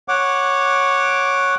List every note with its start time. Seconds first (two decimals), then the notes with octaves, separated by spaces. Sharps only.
0.08 C#5 F#5 D6